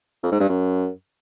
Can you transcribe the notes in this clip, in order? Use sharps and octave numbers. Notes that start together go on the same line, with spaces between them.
F2
G#2
G2
F#2